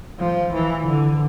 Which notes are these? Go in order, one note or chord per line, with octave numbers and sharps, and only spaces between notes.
F3
E3
D3